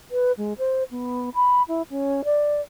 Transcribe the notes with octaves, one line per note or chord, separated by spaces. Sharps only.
B4
G#3
C5
B3
B5
E4
C#4
D5